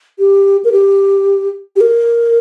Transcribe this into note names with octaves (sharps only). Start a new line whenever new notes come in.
G4
A#4
G4
G4
A#4